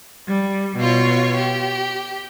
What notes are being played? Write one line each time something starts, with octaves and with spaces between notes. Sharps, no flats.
G3
B2 F4 C#5
G4